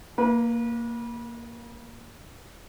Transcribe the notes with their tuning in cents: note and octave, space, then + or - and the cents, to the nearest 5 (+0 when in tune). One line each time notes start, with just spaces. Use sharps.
A#3 +0 B4 -35